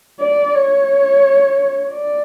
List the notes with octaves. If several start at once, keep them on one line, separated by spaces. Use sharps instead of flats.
D5
C#5
D5